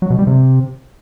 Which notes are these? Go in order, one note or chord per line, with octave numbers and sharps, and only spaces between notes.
F#3
B2
G3
C3